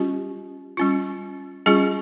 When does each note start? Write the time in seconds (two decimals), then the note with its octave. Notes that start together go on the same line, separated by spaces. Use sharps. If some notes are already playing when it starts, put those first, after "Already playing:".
Already playing: G3 C#4 F4 G4
0.77 G3 C#4 F4
1.66 G3 C#4 F4 G#4